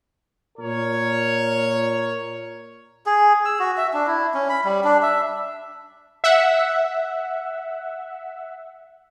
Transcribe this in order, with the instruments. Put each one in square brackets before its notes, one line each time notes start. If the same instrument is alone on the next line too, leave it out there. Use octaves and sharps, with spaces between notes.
[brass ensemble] A#2 A#4 C#5
[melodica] G#4
E6
F#4
E5
D4
E4
C#4
B5
G3
D4
E5
[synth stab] E5 F#5